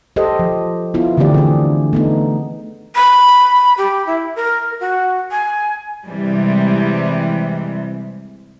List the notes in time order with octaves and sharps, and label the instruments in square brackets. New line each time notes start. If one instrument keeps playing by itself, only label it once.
[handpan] G4 A4 C5 D#5
F3
B3 E4 F4
D3 E3 A3 C4 G4 D5
D4 G#4
A3 B3 D#4
[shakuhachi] B5
G4
E4
A#4
F#4
G#5
[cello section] C3 E3 G3 G#3